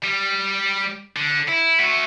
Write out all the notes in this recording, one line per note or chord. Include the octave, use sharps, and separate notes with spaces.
G3
D3
E4
A3 F#4